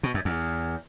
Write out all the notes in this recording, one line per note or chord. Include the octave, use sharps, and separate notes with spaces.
B2
F#2
E2